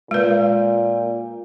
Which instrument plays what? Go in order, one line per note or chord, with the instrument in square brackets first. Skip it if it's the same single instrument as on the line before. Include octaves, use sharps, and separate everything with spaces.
[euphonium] A#2 [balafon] G#3 B4